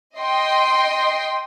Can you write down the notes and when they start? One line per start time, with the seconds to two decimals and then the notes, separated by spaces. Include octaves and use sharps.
0.17 D#5 G5 C6